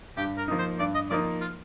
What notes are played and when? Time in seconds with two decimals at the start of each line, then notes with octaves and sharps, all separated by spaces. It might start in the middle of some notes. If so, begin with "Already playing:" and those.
0.17 G2 G4
0.38 A#4
0.48 F3 A#3 D#4
0.59 C5
0.79 G2 D5
0.95 D#5
1.10 F3 A#3 D#4 D5
1.41 F4